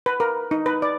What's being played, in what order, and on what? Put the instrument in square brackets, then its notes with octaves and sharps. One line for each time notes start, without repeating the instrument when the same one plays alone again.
[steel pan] B4
A#4
D#4
B4
D5